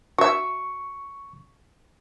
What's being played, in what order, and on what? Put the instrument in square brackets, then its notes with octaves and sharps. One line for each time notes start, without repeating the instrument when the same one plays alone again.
[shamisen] F#4 E5 [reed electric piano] C#6